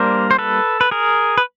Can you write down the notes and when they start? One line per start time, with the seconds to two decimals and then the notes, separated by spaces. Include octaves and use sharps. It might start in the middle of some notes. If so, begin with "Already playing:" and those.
Already playing: G3 A#3 D4 A#4 C5
0.31 C5
0.39 A4 B4
0.81 B4
0.91 G#4 A#4
1.38 B4